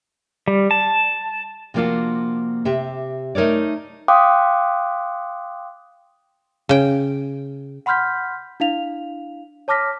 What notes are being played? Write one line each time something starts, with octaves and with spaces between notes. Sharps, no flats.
G3
A5
C3 F3 A#3 D4 F4 F#4
C3 G4 E5
A3 D#4 A#4 C#5 D5
F5 G5 C6 D6 D#6 F#6
C#3 G5
F#5 B5 C6 F6 G6 B6
D4 E4 F5 F7
C#5 A5 D6 F6 A#6 B6